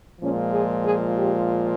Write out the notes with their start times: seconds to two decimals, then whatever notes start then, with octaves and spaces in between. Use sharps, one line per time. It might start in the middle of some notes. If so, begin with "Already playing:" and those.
0.21 A#2 F3 G#3 C#4
0.52 G#4
0.84 G#4
1.16 G4